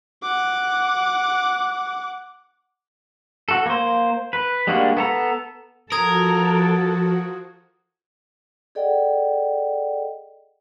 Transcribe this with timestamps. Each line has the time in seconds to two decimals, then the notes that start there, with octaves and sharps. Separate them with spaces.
0.22 F#5 D6
3.49 F#4 A4
3.66 A#3 C5
4.33 B4
4.67 G3 G#3 A#3 D4 F#4
4.97 B3 A4 A#5
5.92 F3 F#4 A4 A#4 D#6 G#6
8.75 G#4 A4 D5 D#5 F#5 G5